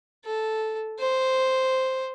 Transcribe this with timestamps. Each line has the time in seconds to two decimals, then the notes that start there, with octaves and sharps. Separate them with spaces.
0.25 A4
0.99 C5